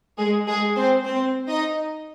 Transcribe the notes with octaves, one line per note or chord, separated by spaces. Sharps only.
G#3 G#4
G#3 G#4
C4 C5
C4 C5
D#4 D#5